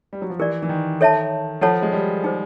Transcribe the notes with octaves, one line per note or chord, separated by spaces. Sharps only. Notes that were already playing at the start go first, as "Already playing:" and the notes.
G3
F#3
F3
E3 G4 A#4 D5
E3
D#3
A4 C#5 E5 A5
F3 F4 A4 C#5 F#5 A5
G#3
G3
D#4 G#4 C5